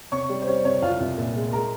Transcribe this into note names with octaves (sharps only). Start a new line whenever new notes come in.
C3 C#5 C#6
G3
C5
G3 C#5
C3 C#5
C2 F4 F5
C2
A#2
G#3
G#3 A#4 A#5